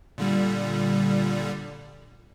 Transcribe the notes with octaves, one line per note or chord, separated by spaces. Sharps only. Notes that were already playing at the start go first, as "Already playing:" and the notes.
A#2 D3 G3